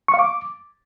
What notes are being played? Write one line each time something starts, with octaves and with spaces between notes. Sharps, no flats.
C#6
F5
D6